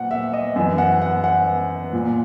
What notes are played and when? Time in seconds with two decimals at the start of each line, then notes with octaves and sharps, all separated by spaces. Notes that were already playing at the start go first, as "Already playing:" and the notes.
Already playing: A#2 F#5
0.11 E5
0.34 D#5
0.56 F#2 E3 E5
0.78 F#5
1.02 F#5
1.24 F#5
1.93 A#2